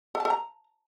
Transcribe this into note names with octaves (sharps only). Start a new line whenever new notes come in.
A4
A5
A4
A#5